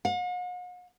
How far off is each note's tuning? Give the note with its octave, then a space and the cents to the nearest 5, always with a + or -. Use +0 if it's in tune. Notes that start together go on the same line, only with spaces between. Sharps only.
F#5 -45